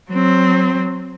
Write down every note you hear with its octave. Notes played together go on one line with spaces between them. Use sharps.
F#3 C4